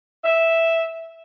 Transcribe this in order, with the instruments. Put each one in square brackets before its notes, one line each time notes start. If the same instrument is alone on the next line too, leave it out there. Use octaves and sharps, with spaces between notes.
[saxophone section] E5